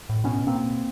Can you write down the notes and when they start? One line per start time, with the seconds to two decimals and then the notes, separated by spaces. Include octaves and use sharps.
0.09 A2
0.24 B2 B3 C#4
0.39 B2
0.47 A#3 C4
0.55 B2
0.70 B2